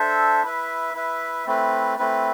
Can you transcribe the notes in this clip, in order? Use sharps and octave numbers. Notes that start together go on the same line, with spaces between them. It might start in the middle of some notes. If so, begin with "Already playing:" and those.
Already playing: D4 A4 C5 E5
E4 B4 E5
E4 B4 E5
A3 C4 E4 B4
A3 C4 E4 B4